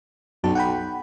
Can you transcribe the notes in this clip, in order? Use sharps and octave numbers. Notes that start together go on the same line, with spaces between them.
B1 F#2 F#4 A5
F#5 G5 B5